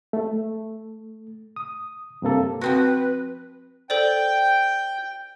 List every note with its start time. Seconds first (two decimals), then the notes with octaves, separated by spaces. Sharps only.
0.13 A3
1.56 D#6
2.22 G2 C3 A#3 A4
2.61 F3 C4 F#4 B4
3.90 A4 C5 D5 G5